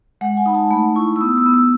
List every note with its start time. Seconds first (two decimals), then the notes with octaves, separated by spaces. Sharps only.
0.21 G#3 F#5
0.37 G#5
0.46 D#4 B5
0.55 A5
0.71 A3 B5
0.96 E4 C#6
1.16 E6
1.21 B3 D#6
1.38 E6
1.46 B3
1.54 E6